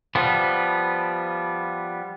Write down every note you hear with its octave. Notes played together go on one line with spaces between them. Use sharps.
F3 G3 B3